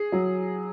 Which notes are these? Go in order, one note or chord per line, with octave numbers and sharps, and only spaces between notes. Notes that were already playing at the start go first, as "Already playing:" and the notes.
Already playing: G#4
F#3